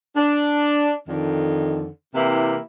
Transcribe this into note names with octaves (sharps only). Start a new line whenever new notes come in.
D4
F2 D3 D#3
C3 E3 A#3 E4 G4